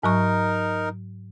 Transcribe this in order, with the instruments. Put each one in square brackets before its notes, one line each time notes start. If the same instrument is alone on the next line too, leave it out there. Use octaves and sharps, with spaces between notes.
[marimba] G#2 F#3 C#6 [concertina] D#4 A#4